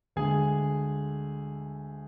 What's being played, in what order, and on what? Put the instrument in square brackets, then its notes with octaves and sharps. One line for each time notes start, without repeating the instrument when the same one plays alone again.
[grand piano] D2 D3 G#3 G#4